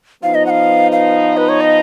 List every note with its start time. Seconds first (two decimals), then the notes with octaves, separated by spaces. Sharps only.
0.23 F3 B3 D#4 F5
0.35 D#5
0.46 F#5
0.50 F5
0.92 F5
1.37 B4
1.49 C#5
1.61 D#5